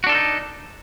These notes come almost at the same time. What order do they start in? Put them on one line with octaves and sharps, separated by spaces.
F#4 D4 A4 F4 D#4